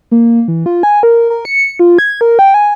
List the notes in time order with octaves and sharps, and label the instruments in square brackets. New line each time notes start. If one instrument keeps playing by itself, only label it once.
[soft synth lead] A#3
E3
F4
G#5
A#4
A#4
C#7
F4
G#6
A#4
G5
G#5